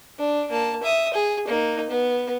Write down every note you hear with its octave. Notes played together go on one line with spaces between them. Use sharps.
D4
A#3 A5
E5 D#6
G#4
A#3 D#4
B3